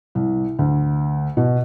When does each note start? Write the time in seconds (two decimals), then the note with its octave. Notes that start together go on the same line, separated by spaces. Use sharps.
0.15 C2
0.59 D2
1.37 B2